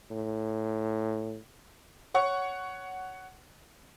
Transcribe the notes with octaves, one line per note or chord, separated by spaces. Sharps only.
A2
C#5 F#5 C#6